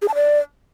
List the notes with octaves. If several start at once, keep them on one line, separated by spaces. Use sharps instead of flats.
G#4
A5
D5